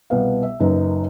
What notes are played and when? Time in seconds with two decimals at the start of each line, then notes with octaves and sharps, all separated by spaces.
0.10 C2 B2 B3 F5
0.43 E5
0.60 F#1 F#2 D#4 B4